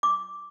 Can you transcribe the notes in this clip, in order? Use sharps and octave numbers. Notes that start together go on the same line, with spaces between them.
D6